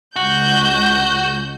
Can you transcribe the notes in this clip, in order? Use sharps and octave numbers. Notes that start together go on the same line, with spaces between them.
C#2 F#4 G6